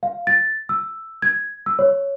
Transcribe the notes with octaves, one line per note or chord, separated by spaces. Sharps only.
F5
A6
E6
G#6
E6
C#5